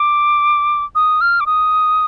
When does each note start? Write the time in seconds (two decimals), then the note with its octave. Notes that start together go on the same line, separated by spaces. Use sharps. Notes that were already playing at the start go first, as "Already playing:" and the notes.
Already playing: D6
0.95 D#6
1.21 F6
1.40 D6
1.46 D#6